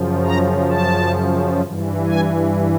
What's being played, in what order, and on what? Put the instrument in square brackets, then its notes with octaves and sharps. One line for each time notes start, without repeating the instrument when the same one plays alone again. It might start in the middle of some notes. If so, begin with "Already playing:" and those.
Already playing: [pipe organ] F#2 C#3 F3
A#5
A5
G2 E3
G#5